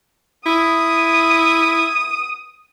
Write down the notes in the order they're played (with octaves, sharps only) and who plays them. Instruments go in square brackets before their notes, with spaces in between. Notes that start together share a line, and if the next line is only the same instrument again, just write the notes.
[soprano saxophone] E4 [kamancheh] D#6